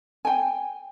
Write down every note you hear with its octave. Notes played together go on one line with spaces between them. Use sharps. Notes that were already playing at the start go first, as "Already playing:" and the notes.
G5 G#5